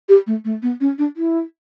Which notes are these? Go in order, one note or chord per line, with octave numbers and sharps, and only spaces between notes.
G4
A3
A3
B3
C#4
D4
E4